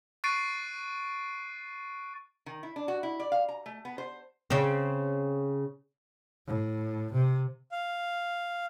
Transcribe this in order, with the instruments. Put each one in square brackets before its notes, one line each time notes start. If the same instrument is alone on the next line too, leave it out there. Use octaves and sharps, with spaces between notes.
[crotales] C#6 F#6 A6 C7 D7 D#7
[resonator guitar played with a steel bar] D#3
E4
D4
F#4
E4
D5
F5
A#5
A3
B3
C5
[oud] C#3 C4
[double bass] A2
C3
[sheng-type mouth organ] F5